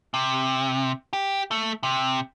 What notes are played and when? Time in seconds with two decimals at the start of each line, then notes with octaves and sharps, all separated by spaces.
0.14 C3
1.13 G4
1.51 A3
1.83 C3